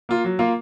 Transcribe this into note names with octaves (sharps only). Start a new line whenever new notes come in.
A#3 F4
F#3
A#3 F4